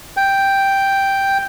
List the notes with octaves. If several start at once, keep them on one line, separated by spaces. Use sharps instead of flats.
G5